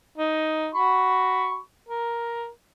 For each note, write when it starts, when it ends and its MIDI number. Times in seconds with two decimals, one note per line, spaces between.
0.18 0.69 63
0.75 1.58 66
0.75 1.58 83
0.75 1.58 85
1.89 2.48 70